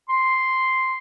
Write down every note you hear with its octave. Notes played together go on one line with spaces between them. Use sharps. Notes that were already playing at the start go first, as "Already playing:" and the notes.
C6